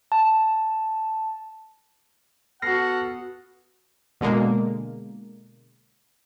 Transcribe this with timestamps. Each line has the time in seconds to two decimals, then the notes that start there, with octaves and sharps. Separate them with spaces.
0.12 A5
2.62 B3 F#4 A4 F#5 F6 A#6 C7
4.21 B2 D3 G#3 A#3